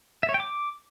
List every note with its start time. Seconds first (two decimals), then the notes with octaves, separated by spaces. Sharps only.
0.23 E5
0.29 C#5
0.34 G5
0.40 D6